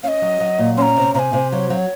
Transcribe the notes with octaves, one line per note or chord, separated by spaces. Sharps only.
C#4 D#5 F5
F#3
F#3
A#2
C#4 A#5 C6
C3
C3 G#5 A#5
C3
F#3 C#5
F#3 C5
C#5